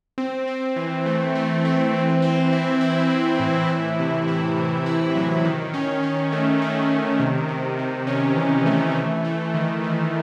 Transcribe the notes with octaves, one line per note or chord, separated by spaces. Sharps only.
C4
C4
E3
A3
A3
C4
E3
C4
E4
E4
E3
A2
E4
C3
E4
C3
E4
F#3
D#3
C#4
C#4
A3
D#3
D#3
C3
C3
C3
C#4
E3
A3
A3
A3
D#3
D#3